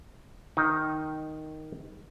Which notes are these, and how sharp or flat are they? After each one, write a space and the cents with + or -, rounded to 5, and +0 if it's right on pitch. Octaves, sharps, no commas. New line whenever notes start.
D#3 +0 D#4 +0